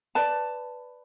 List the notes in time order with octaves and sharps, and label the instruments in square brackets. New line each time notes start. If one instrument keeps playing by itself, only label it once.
[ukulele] B4 D5 A5